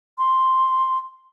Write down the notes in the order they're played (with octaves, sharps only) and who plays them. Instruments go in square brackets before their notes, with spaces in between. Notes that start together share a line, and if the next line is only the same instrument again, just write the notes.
[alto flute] C6